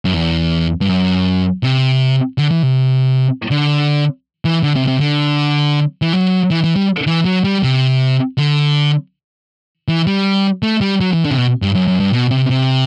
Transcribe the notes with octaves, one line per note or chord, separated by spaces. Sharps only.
F#2
E2
G2
F#2
C3
D3
E3
C3
D3
E3
D3
C3
C3
D3
E3
F#3
E3
E3
G3
E3
F#3
G3
C3
D3
E3
G3
A3
G3
F#3
E3
D3
C3
B2
G2
F#2
F#2
G2
B2
C3
C3